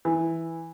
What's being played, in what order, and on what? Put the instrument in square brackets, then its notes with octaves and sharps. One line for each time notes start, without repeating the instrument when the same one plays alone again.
[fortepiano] E3